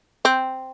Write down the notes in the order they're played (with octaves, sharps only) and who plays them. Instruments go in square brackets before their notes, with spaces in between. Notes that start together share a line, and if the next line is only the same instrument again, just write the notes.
[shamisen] C4